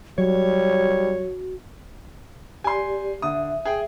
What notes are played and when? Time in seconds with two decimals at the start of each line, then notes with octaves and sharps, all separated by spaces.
0.18 F#3 G3 F#4 C#5
2.64 G4 D5 G#5 C6
3.22 D3 E5 D#6
3.65 G#4 G5